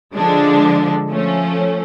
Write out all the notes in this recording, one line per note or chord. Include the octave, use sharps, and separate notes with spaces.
D3 F3 G#3 D4
F3 A3 C#4